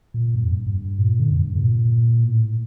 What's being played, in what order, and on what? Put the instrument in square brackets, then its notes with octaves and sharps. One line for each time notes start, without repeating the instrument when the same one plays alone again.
[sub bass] A#2
G2
F2
G2
G2
A#2
D3
F2
G2
C3
A#2
A2